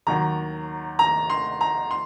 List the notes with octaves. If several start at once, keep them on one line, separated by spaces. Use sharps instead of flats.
D#2 D#3 F#3 A#5
A#5
C6
A#5
C6